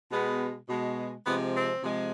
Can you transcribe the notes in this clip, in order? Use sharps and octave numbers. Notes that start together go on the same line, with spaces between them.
B2 G#3 B3
B2 G#3
C3 F3 G#3 B3
C4
C3 F3 G#3